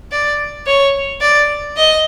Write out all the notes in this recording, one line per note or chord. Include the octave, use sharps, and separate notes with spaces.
D5
C#5
D5
D#5